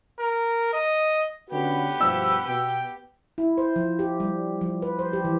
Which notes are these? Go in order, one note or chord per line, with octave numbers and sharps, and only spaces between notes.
A#4
D#5
D3 B3 C#4 F#4 G4 B4
G2 B2 F3 E6
B2 G5
E4
C5
F3
G4
G3
F3
B4
C5
G4
E3